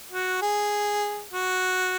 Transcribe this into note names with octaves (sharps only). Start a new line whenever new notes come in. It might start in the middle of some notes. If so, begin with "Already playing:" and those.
F#4
G#4
F#4